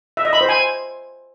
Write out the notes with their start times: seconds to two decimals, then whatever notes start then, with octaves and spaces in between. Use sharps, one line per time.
0.17 E5
0.25 D#5
0.33 B5
0.41 C5
0.49 G#5